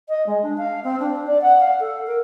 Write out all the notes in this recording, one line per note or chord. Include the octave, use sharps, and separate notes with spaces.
D#5
G#3
D4
F5
C4
D4
D5
F#5
F5
A4
A#4